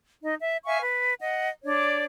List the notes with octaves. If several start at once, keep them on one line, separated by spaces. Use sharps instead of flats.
D#4 D#5
E5
E5 F5 G#5 C#6
B4
D#5 F#5
D4 C#5 D5